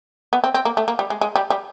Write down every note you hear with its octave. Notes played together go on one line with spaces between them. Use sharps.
B3
C4
C4
A#3
A3
A#3
G3
G#3
G#3
G3
G3